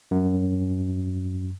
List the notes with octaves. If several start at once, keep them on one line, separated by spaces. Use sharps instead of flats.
F#2